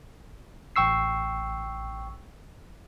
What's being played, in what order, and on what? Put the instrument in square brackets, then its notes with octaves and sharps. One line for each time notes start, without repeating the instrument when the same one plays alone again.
[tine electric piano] A1 G5 C#6 E6 C7